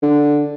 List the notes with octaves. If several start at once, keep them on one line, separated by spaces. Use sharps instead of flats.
D3